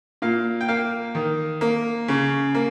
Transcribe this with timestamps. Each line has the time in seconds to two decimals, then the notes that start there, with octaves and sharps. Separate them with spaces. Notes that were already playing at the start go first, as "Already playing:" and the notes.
0.22 A#2 F5
0.61 G5
0.68 A#3 F5
1.15 D#3
1.61 A#3
2.08 C#3
2.55 A#3